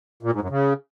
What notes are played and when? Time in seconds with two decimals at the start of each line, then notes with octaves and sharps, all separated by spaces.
0.23 A#2
0.32 G#2
0.41 F#2
0.50 C#3